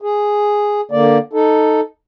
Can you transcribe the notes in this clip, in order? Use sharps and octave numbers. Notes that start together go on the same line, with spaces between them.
G#4
D3 A#3 D5
D#4 A4